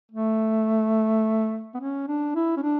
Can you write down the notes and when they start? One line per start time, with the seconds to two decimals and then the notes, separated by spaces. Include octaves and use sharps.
0.12 A3
1.74 B3
1.79 C#4
2.07 D4
2.35 E4
2.57 C#4
2.62 D4